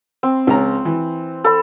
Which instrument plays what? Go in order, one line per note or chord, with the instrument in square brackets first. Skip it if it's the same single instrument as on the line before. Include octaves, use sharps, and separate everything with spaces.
[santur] C4
[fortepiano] C#2 A#5
E3
[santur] A4 B5